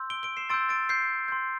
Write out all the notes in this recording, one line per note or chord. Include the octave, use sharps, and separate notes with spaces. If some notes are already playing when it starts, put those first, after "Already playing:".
Already playing: C6 E6 G6
D7 G7
D7 G7
C7 E7
C6 E6 G6 A6 D7
A6 D7
G6 C7
C6 G6